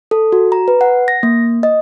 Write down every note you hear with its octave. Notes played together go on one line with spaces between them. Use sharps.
A4
F#4
A#5
B4
F#5
A#6
A#3
D#5